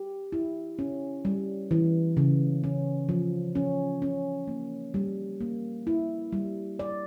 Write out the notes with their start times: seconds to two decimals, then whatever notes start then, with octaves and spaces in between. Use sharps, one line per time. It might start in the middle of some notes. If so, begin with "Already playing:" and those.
Already playing: G4
0.32 E4
0.79 C#4
1.25 G3
1.71 E3
2.17 C#3
2.64 C#4
3.09 F3
3.55 C#4
4.02 C#4
4.48 A#3
4.94 G3
5.41 A#3
5.87 E4
6.32 G3
6.79 D5